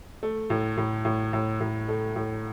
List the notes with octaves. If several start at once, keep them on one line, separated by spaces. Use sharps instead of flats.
A3
A2
A2
A2
A2
A2
A3
A2